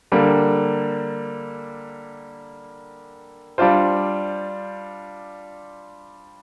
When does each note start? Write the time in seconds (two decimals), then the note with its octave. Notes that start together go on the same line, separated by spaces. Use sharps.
0.12 D3 G3 A#3
3.58 G3 D4 F4 C5